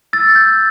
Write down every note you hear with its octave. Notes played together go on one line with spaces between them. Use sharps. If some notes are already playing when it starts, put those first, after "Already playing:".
E6 A6
G6